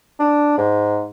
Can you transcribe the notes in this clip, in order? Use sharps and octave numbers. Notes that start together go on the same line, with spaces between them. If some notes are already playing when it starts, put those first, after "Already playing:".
D4
G#2